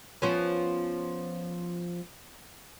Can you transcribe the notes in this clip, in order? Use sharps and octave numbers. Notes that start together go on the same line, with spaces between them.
F3 B3 C#4